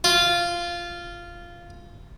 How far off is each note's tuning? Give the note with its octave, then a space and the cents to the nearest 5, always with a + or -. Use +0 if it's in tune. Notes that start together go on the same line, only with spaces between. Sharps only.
F4 -10